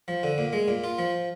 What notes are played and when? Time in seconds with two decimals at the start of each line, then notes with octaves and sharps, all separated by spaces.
0.08 F3
0.23 D3
0.38 A#2
0.53 G#3
0.68 A#2
0.84 F4
0.98 F3